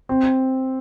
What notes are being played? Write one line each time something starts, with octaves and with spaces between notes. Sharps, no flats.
C4